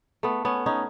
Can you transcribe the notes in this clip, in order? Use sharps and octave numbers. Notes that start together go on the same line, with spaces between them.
A3 B3
B3 C#4
C#4 D#4